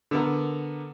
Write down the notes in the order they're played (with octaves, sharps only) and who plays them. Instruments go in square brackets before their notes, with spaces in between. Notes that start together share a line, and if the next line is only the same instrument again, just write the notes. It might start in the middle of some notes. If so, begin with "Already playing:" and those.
[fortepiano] D3 B3 A#4